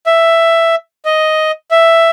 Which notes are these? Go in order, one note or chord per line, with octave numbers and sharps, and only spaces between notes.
E5
D#5
E5